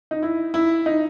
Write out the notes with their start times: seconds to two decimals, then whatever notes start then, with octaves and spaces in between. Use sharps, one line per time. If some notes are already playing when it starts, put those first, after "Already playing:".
0.11 D#4
0.23 E4
0.54 E4
0.86 D#4